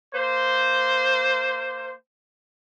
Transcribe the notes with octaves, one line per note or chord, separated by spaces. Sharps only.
A#3 C5